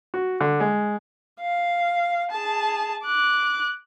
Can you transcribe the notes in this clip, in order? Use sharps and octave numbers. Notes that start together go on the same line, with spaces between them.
F#4
D3
G#3
F5
G#4 A5
D6 F#6